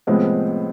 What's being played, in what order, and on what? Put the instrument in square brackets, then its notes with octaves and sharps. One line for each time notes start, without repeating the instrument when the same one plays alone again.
[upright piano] A2 F3 G#3 B3 [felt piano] C3 C4